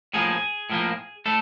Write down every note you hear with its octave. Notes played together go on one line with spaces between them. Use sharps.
A2 F3 A#3 G#4
A2 F3 A#3
A2 A3 A4